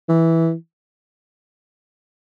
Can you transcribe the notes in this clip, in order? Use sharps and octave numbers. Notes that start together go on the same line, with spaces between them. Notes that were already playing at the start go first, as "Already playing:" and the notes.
E3